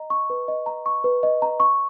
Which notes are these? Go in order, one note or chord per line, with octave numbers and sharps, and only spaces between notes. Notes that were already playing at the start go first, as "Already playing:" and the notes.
Already playing: D#5 A#5
C#6
B4
D#5
A#5
C#6
B4
D#5
A#5
C#6